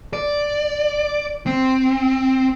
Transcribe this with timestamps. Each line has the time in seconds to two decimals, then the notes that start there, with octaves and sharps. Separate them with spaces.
0.13 D5
1.46 C4